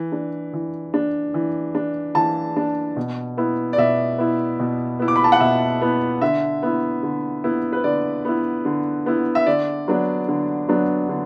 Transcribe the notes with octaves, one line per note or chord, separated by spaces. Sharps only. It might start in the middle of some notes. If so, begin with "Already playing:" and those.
Already playing: E3
D4
E3
D4
E3
D4
E3 A5
D4
B2
B3 E4
D5
B2 E5
B3 E4
B2
B3 E4
D6
B5
A5
F#5
B2 E5
B3 E4
D3 E5
B3 E4
D3
B3 E4
B4
D3 D5
B3 E4
D3
B3 E4
E5
D3 D5
F#3 B3 D4
D3
F#3 B3 D4
D3